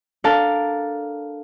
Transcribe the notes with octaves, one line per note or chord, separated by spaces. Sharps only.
D4 A4 A#4 F5 A5